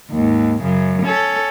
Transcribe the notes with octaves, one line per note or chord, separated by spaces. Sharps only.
D#2 G#2
F#2 C#3
C#4 A4